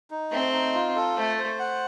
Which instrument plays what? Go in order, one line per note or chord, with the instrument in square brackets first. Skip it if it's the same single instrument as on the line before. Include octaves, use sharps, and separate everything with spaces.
[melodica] D#4
[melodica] A3 [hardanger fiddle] C4
[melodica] D#4
F4
A4
[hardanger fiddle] A3 [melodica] C5
[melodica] C5
F#5